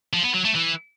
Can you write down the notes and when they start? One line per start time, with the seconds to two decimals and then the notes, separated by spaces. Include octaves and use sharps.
0.14 F3
0.24 B3
0.34 F#3
0.45 A3
0.55 E3